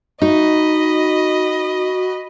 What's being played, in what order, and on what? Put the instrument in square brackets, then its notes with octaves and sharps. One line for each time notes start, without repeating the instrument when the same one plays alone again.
[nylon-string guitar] D#4 [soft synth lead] F#4 [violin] D#5 B5